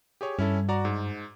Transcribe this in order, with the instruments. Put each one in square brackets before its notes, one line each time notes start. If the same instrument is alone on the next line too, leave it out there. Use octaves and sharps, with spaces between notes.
[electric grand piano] G4 G#4 C#5
[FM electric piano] G2 [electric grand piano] C#4 E4 A4
[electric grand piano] F#4 D5 A#5
G#2